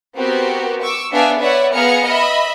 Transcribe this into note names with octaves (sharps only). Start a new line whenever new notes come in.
B3 C4 F#4 G4 A#4
C#6 D6 E6
B3 D4 G#4 D5 E5 F5
B4 C#5 D5 E5 F#5
B3 G#4 F5 A#5 F6 C#7
D#5 E5 B5